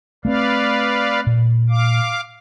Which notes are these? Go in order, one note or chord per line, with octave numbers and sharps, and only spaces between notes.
A3 A#3 C4 B4 D5 F5
A#2
F5 D6